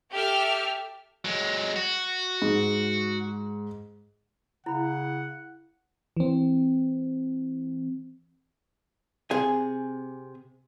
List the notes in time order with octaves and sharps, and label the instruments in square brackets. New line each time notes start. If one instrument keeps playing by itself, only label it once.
[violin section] G4 A4 E5 F6
[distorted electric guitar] F#3 G#3
F#4
[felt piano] G#2
[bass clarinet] C#3 [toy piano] E4 B5 [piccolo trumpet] F#5
[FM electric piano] E3 C4
[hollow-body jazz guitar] C3 G#4 G#5